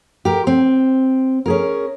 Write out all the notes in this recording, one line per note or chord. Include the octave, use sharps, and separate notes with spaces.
G4 A#4
C4
C#4 G#4 A#4